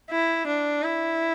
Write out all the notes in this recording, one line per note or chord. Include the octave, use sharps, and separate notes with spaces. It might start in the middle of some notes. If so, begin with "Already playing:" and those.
E4
D4
E4